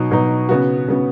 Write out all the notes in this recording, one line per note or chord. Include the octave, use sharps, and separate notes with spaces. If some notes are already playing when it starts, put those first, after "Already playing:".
Already playing: B2 F#3 D#4
B2 F#3 D#4
C#3 B3 F#4
C#3 B3 F#4